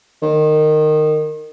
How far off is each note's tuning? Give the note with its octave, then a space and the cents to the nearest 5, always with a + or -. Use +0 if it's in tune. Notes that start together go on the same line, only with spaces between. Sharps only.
D#3 -20